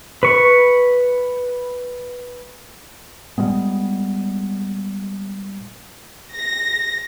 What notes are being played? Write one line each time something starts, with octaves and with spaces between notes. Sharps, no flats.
B4 C#6
A#2 G3 G#3 B3
A#6